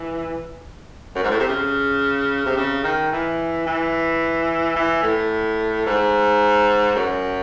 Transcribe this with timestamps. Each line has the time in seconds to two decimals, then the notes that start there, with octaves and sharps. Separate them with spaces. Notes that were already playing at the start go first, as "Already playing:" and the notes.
Already playing: E3
1.15 F#2
1.23 G#2
1.31 A2
1.39 C3
1.48 C#3
2.46 C3
2.57 C#3
2.84 D#3
3.12 E3
3.66 E3
4.76 E3
5.03 A2
5.86 G#2
6.95 F#2